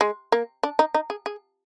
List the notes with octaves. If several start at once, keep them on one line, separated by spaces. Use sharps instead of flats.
G#3
A#3
D4
D#4
D#4
G#4
G#4